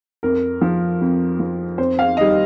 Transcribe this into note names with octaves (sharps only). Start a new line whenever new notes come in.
F2 A#4
F3
F2
F3
F2 C5
F5
D#3 G3 D#5